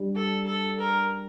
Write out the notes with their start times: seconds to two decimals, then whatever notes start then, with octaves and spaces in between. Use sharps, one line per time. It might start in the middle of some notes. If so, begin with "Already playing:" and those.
Already playing: G3 D4
0.16 A4
0.47 A4
0.79 A#4